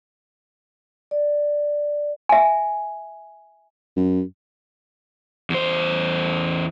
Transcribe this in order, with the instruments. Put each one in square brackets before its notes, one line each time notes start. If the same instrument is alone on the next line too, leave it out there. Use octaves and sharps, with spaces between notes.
[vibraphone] D5
[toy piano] E5 G#5
[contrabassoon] F#2
[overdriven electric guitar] E2 C5